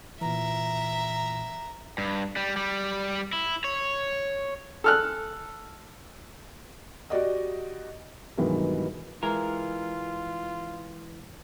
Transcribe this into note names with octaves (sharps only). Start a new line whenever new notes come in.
A#2 E3 E5 A#5
G2
G3
G3
E4
C#5
A4 F6 F#6
F#4 G4 D5 D#5
G2 B2 D#3 E3 F#3 G#3
E3 G#3 F4 A#4